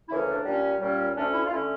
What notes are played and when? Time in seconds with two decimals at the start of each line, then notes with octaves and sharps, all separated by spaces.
0.09 D2 C#3 E3 A#3 C#4 E4
0.27 D4
0.44 A#2 G3 C#4
0.79 A#2 G3 C#4
1.16 D2 D3 A3 C#4 D4
1.33 E4
1.45 F4
1.51 D3 A3 C#4 E4